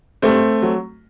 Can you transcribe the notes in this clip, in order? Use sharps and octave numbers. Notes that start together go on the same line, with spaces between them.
G2 A3 C4
F#3